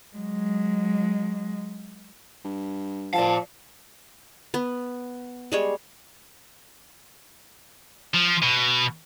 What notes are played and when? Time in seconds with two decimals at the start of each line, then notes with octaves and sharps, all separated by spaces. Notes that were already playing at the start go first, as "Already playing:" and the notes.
0.17 F#3 G#3
2.45 G2
3.14 F3 D5 F5 A5
4.54 B3
5.52 G3 G#3 C#5
8.14 F3
8.42 B2